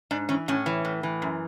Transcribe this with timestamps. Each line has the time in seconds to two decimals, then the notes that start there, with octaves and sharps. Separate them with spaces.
0.11 G#2 D4
0.29 E3 C#4
0.48 A2 C#4
0.66 E3
0.85 A2
1.03 E3
1.22 F#2